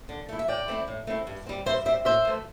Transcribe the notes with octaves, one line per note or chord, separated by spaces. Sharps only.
D3
A3 E4
E5
A2 D5 G5
A3 C4 E4
A2
A3 C4 E4
G2
G3 C4
G2 C5 E5
G3 C4 C5 E5
A2 C5 E5
E3 A3